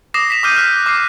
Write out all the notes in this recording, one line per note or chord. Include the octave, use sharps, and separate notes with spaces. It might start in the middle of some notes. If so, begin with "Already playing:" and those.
D6 D#6 A#6 C7 E7
A#6 B6 E7
D6 D#6 F6 G6 D#7
F6 F#6 B6
D6 C7